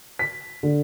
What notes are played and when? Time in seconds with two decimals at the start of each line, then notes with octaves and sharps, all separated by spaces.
0.19 B6
0.63 D3